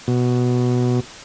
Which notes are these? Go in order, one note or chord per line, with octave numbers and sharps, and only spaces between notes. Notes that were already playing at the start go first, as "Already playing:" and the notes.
B2